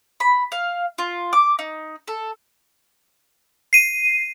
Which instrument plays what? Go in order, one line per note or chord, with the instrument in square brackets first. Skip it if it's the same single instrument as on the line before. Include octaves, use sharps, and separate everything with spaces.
[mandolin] B5
F5
F4
D6
D#4
A4
[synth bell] C7 D#7